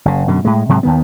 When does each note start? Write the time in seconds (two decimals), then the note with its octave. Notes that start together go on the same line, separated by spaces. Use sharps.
0.05 F#1 C#3
0.28 F#2 B2 D3
0.45 A2 G#3
0.69 G#2 C3 F#3 G#3
0.83 D#2 D#3 B3